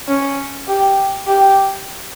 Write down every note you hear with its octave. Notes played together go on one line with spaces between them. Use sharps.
C#4
G4
G4